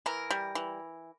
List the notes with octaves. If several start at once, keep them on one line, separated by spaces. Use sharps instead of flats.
E3 A#4
G3
E3